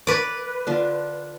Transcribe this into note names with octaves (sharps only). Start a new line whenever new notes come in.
B4 D5
D3 D4 F4